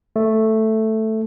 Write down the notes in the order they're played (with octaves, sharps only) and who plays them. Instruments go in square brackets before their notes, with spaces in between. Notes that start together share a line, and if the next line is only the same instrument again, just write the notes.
[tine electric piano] A3